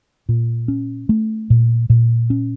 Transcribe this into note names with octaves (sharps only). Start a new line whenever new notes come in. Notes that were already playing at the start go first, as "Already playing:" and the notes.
A#2
C#4
A3
A#2
A#2
C#4